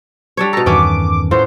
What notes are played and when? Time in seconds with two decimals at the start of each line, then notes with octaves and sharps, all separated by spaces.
0.37 G3 D4 C#5
0.53 B2 A4 A#5
0.66 E2 G2 D#3 B3 C#4 D6
1.31 A2 B3 F4 C5